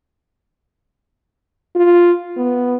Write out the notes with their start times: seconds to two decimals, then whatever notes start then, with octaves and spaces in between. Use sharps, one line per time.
1.75 F4
2.37 B3